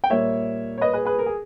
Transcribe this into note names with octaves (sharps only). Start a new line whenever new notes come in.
G5
A#2 G3 A#3 C#5 E5
C#5
B4 D#5
G#4 B4
G#4 B4
A#4
G#4